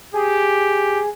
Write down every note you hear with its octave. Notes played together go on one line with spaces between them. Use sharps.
G4 G#4